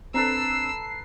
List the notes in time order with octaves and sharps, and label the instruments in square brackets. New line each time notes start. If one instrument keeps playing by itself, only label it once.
[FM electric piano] C4 D4 [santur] A4 B4 A#5 [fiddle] E6 [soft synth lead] C7